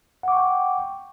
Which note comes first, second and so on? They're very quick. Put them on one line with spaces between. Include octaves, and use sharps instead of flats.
F#5 D6 C#6 G5